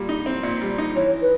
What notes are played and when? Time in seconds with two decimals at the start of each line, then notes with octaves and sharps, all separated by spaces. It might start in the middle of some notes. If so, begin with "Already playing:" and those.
Already playing: A#2 G3
0.09 D#4
0.26 C4
0.43 A#2
0.61 G3
0.78 D#4
0.96 E3 C#5
1.22 B4